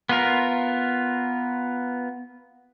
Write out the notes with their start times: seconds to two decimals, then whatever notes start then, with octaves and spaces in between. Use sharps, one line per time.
0.09 B3 F4 A#4